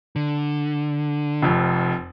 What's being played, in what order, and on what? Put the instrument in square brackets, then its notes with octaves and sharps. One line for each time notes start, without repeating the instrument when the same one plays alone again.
[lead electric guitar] D3
[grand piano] F1 F2